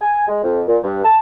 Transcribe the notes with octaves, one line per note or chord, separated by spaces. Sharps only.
G#5
G#3
F2
A#2
G2
A5